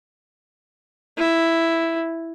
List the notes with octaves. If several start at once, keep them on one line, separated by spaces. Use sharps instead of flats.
E4